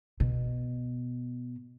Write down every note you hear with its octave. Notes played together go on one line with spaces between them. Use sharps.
B2